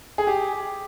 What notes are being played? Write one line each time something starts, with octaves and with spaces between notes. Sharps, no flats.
G#4
G4